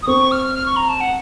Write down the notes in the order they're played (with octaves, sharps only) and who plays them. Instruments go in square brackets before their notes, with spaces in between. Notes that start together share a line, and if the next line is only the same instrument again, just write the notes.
[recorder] D#6
[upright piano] C4 [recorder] C#6
[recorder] F6
F6
C#6
A#5
A5
F#5